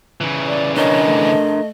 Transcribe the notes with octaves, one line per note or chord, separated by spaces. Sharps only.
C#3 E3
D5
D4 A#4 C#5 D#5
A3